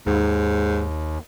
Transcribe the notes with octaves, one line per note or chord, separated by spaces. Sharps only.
D#2 G#2